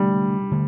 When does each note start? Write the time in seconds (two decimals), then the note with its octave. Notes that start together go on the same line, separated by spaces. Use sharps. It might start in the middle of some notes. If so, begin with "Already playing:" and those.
Already playing: D3 G3 A3 D4
0.51 D3 A3